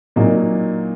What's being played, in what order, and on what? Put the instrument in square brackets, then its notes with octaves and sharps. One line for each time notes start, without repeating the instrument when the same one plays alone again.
[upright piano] A#2 F#3 A#3 D#4